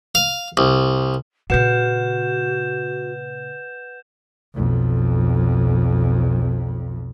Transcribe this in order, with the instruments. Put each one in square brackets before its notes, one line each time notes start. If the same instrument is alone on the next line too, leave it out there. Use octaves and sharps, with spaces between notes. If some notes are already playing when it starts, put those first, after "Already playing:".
[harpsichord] F5
C2
[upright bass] A#2 C#3 [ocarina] F#4 [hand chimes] B4 F#5 [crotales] G6 E7
[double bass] B1 F2